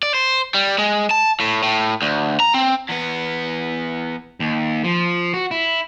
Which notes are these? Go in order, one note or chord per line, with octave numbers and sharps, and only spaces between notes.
D5
C5
G3
G#3
A5
A2
A2
D2
A#5
C4
E2 B3
D#2
F3
F#4
E4